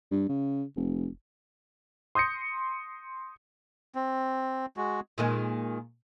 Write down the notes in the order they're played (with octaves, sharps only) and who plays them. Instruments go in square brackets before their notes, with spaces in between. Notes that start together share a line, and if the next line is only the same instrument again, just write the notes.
[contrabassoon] G2
C#3
F1
[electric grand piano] C6 D#6 G6 A#6 C#7
[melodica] C4
G#3 F#4
[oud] A#2 D#3 G#3